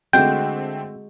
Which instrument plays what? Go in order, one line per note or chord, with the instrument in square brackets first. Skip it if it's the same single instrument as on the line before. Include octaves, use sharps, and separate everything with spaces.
[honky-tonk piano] D3 A3 C4 [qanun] G#3 F#4 [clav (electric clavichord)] G5